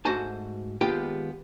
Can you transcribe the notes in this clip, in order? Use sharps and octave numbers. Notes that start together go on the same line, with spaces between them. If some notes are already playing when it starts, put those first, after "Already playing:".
G#2 A3 F#4 C5 G#5 A5
D#2 G#3 B3 F4 G4 G5